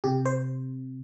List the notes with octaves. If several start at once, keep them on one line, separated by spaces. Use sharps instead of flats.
C3 G4
C5